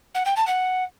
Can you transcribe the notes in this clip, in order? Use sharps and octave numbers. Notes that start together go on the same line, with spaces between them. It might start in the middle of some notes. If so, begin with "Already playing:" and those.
F#5
G5
A5
F#5